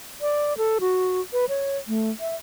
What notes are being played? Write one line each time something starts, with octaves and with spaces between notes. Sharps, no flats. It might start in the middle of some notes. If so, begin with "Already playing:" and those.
D5
A4
F#4
B4
C#5
A3
E5